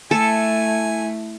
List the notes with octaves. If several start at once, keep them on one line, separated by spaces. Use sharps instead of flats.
A3 E4 A4 G#5